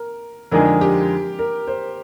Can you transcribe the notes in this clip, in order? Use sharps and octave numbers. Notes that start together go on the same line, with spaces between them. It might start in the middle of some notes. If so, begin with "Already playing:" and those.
Already playing: A#4
F2 D3 G#3 D#4 G#4 A#4
G4
A#4
C5